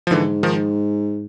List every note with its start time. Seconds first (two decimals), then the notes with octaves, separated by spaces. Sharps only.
0.07 F3
0.11 G#2 D3 E3
0.43 D#3 F3